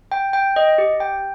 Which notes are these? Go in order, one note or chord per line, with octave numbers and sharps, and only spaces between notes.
G5
G5
D#5
G4
G5